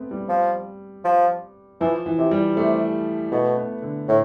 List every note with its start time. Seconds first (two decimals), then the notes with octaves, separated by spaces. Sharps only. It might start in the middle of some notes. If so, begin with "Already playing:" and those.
Already playing: A3 B3 C4
0.11 G3
0.29 F3
1.05 F3
1.81 E3 F3
2.06 E3
2.18 C3
2.31 G3
2.56 C3 A3
3.32 B2 A3
3.57 B3
3.82 D3
4.08 A2